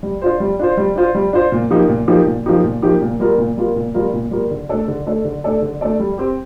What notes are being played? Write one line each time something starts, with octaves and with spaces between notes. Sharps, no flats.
G3
D4 F4 C5
G3
D4 F4 C5
G3
D4 F4 C5
G3
D4 F4 C5
A#2
F3 A#3 D#4 G4
A#2
F3 A#3 D#4 G4
A#2
F3 A#3 D#4 G4
A#2
F3 A#3 D#4 G4
A#2
G3 A#3 F4 A#4
A#2
G3 A#3 F4 A#4
A#2
G3 A#3 F4 A#4
A#2
G3 A#3 F4 A#4
D3
A3 D4 A4 D5
D3
A3 D4 A4 D5
D3
A3 D4 A4 D5
D3
A3 D4 A4 D5
G3
C4 G4